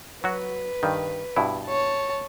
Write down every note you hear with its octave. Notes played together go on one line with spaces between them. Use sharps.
F#3 F#4 B4
G2 D#3
G2 B2 E4
C#5 A5